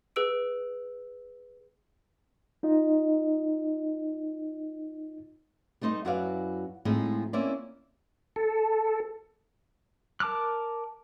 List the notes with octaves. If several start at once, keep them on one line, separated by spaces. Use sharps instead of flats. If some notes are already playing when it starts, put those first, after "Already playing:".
G#4 B4 E6 D7
D#4 F4 D#5
G3 A3 D#4 C5 D#5
F#2 E4 F#4 B4 D5 F5
A2 F3 G#3 C4 D#4
A#3 C4 C#4 E4 C5 D5
A4
A#4 A5 D6 F6 F#6